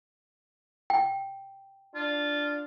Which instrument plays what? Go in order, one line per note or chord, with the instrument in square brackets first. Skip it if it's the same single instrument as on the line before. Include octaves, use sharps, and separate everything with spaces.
[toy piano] G5
[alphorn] D4 [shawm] F4